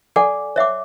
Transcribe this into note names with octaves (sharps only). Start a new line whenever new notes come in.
A4 D5 F#5 G#5 D6
C#5 E5 F#5 D6